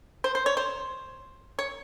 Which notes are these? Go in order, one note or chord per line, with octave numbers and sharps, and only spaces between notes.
C5
C5
C#5
C5
C#5